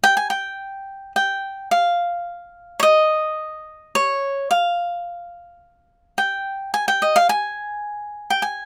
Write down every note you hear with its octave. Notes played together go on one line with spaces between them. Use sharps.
G5
G#5
G5
G5
F5
C#5
D#5
C#5
F5
G5
G#5
G5
D#5
F5
G#5
G5
G#5